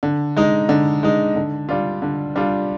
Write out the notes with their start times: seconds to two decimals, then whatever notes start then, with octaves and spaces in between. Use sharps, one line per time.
0.03 D3
0.37 G#3 D#4
0.69 D3
1.03 G#3 D#4
1.36 D3
1.69 G3 D4 F4
2.02 D3
2.36 G3 D4 F4